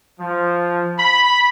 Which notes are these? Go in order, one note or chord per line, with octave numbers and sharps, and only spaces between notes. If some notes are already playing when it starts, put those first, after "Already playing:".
F3
B5